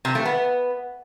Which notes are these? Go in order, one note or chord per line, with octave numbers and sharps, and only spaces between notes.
C3
A3
B3